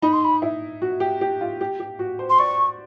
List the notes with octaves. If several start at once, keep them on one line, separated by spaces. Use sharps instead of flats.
D#4 B5
C6
B5
E4
F#4
G4
G4
F4
G4
G4
F#4
C5
C6
D5 C#6